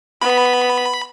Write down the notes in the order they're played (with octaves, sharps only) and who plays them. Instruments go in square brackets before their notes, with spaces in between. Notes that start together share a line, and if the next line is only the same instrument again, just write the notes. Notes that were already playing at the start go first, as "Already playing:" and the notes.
[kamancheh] B3 [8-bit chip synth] B5